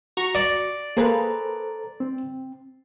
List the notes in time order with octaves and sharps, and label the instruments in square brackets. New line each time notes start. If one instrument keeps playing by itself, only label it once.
[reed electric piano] F#4 [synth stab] A#5 C#6
[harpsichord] D5
[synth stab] A#3 G#4 B4 [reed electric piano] A4 C5 A#5
[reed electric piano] C4